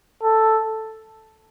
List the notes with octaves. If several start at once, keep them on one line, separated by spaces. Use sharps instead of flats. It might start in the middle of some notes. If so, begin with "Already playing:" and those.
A4